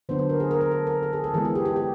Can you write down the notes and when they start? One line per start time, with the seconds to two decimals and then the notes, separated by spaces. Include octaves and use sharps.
0.09 D3 F#3 B3 D4 C5
0.19 C5
0.30 A#4
0.40 G#4
0.51 A#4
0.61 A#4
0.71 A4
0.87 A#4
1.03 A4
1.13 G#4
1.24 A4
1.34 E3 G#3 B3 G#4
1.45 G#4
1.55 G4
1.66 G4
1.76 G4